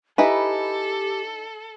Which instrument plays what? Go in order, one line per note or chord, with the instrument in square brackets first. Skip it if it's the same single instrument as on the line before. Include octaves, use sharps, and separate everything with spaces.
[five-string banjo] D#4 E4 B4 [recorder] G4 [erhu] A4 [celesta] D#5 G#5